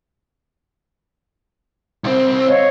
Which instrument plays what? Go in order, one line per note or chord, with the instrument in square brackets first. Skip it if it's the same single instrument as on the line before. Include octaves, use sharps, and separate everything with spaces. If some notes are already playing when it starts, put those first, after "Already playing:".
[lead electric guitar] C2 C4
[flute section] C#5 D#5 F5